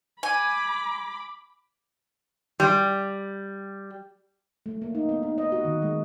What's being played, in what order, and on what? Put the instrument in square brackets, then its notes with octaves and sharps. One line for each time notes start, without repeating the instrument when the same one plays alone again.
[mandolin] G#5 [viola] B5 D6
[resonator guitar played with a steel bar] G3
[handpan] A3
A#3
D#4
B3
D#4
D#5
F#4
D#3
G#3